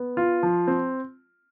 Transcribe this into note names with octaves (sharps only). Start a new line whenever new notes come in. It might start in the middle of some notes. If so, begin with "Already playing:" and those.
Already playing: B3
F4
F3
C4